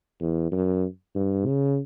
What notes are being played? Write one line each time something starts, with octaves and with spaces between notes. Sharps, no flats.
E2
F#2
G2
C#3